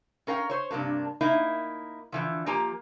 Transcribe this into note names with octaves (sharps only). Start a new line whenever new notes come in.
C#4 A#4 F5 G5
C5 C#5
G2 C3 A#3 D4
A#3 D#4 E4
D3 E3 F3
F3 A#3 G4 G#5 A#5